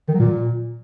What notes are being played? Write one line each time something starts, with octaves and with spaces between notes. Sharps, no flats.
D#3
F#3
A#2